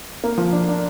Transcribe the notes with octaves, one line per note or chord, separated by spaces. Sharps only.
A#3
F3
D4
D4